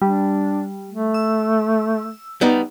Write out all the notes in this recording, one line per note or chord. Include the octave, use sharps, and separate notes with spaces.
G3 D4
A3
E6
G3 B3 D#4